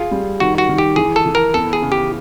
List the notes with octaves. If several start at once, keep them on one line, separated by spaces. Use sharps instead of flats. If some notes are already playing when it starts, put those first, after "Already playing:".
Already playing: F4 G#4
G3
D#3 F#4
F#4
D#3
G4
E3 G#4
A4
E3
A#4
B3 A4
G#4
C#3
G4